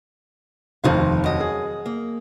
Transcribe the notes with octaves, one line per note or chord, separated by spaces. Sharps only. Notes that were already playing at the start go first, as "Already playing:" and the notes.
F1 D#2 F3 D#4 F5
F#2 D#5
G#4
A#3